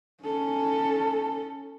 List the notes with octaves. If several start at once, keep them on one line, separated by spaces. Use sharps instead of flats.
C#4 A4